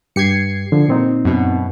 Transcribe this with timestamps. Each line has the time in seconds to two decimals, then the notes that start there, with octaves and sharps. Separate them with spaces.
0.16 G2 G4 G#6 C7 C#7
0.72 D3 F3
0.88 A#2 C4 D#4
1.25 F#2 B2